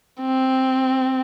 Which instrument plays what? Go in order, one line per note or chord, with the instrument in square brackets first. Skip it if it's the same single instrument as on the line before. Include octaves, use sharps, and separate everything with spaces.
[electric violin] C4